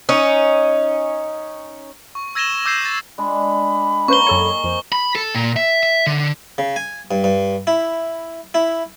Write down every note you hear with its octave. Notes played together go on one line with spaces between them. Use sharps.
C#4 D#4
C#6
E6 G#6 A#6 D#7 E7 G7
D6 E6 G6 G#6 C7 E7
A6
G#3 D4 B5
A#3 C#4 B4 C5 C#6 G7
F#2 G#4 A4 C#5 D#5
F2 C5
B5
A4
A#2
E5
E5
D3
C#3
G#5
G2
G2
E4
E4